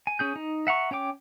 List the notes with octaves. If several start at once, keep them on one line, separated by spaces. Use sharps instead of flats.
G#5
C#4 G#4 G6
D#4
E5 F#5 A#5 C#6
C#4 C#5 G5 D6